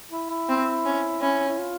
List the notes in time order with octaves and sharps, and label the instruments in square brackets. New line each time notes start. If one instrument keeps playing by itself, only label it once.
[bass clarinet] E4
E4
[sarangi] C4
C#4
[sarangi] C#4 [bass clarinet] E4
[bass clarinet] E4
F4